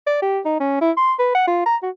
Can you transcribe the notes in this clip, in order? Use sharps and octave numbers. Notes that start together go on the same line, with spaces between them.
D5
G4
D#4
C#4
E4
C6
B4
F#5
F4
A#5
F#4